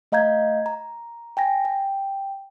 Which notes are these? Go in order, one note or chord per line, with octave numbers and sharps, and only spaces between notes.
A3 D#5 F5 A#5 G6 G#6
A#5
G5 G#5 A#6
G5